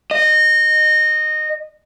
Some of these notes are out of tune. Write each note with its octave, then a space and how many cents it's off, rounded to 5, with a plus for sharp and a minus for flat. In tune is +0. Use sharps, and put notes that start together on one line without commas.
D#5 -20